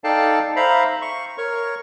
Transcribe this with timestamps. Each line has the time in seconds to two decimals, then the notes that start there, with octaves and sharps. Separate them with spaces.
0.04 D#4 A4 D5 F5 G5 A5
0.56 C5 E5 F5 A#5 B5
1.02 C#6
1.38 A#4 C#5 C#6